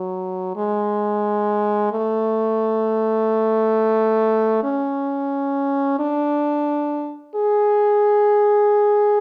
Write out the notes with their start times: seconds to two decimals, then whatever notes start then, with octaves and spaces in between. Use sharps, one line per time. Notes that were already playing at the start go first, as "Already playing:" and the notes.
Already playing: F#3
0.57 G#3
1.92 A3
4.64 C#4
6.00 D4
7.35 G#4